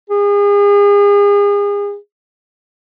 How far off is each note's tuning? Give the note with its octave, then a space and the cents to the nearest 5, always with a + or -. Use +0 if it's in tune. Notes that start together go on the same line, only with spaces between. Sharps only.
G#4 -35